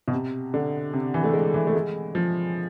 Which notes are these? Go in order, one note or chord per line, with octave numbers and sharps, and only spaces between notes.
B2
C3
D3
C3
E3
A3
G#3
E3
A3
G#3
F3